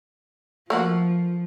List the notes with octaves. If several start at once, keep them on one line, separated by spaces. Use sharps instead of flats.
F3 A3 A#3 F#4